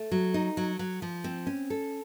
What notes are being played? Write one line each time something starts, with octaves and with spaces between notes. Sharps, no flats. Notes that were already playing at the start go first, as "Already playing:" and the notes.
Already playing: A3
F#3
D#4
F#3
F#3
F3
C4
C#4
A4